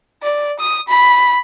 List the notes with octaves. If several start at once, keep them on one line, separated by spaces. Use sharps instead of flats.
D5
D#6
B5